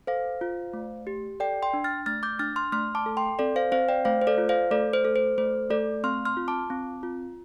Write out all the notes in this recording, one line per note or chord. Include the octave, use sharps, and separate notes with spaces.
A4 C5 F5
F4
A3
G4
A4 D5 G5
G5 C6
D4
F6 A6
A3 F6 A6
D6 G6
D4 F6 A6
C6 F6
A3 C6 F6
A5 D6
A4
G5 C6
C4 A4 D5
C5 F5
C4 C5 F5
D5 G5
A3 C5 F5
C5
A4 D5
F4
C5 F5
A3 A4 D5
C5
A4
C5
A3 C5
A3 A4 D5
C4 C6 F6
C6 F6
F4
A5 D6
C4
F4